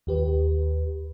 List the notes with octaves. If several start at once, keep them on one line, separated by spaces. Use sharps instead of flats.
D#2 G4 B4